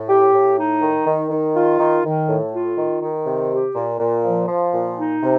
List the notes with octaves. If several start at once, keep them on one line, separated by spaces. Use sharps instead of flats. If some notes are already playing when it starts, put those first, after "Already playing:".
Already playing: A2
G4
A2
D#4
D#3
D#3
D#3
F4
D#3
D#3
A2
F4
D#3
D#3
C3
G4
A#2
A#2
F3
F3
A#2
D#4
C3